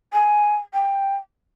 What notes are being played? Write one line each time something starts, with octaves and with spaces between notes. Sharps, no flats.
G#5
G5